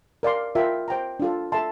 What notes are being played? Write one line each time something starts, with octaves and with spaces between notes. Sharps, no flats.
A#4 D5 F5 C6
F4 A#4 E5 G5
C5 G5 A#5
D4 F4 A4
A4 E5 A5 C6